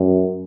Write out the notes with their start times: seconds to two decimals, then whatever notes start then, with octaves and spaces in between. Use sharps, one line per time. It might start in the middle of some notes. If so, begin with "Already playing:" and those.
Already playing: F#2